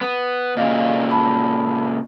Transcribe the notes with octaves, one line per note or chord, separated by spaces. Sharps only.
B3
A#2 C#3 D#5 F5
A5 B5